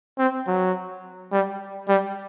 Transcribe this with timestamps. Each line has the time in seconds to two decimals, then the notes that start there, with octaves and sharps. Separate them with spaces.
0.18 C4
0.47 F#3
1.32 G3
1.88 G3